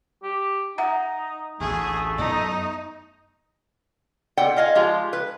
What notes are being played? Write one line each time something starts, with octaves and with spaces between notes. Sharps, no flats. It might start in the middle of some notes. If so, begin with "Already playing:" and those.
G4
D#4 E5 F#5 A#5
A1 D2 A3 G#4
F#2 B3 D#4
B2 C4 D5 F#5 G5
F4 D#5 F5 G#5
F3 G#3 F4 G4 A#5
B4